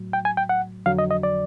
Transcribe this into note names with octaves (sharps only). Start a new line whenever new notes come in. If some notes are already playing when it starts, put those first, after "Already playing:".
Already playing: A2 F#3
G5
G#5
G5
F#5
F2 D3 F#3 F5
D#5
D#5
D5